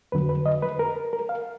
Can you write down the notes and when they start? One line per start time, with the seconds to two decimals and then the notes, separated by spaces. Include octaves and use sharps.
0.12 F2 D3 F#3 B4
0.29 B4
0.46 D#5
0.62 B4
0.79 A#4
1.13 A#4
1.29 F5